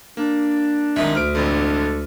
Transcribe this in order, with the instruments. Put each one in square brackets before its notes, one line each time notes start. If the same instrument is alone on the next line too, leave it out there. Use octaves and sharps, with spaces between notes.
[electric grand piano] A#3 [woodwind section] D4
[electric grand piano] C2 F#2 [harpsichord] D#3 G#3 E5
[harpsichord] D2 [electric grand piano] F6 D7
[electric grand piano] A1 F2 D3 [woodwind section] G#3 D4 A4